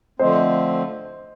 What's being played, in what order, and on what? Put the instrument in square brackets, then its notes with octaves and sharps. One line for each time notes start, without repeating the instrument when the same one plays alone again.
[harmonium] D3 F3 A3 C4 [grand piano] C5 D#5